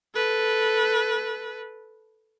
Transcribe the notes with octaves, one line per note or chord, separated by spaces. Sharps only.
A4 B4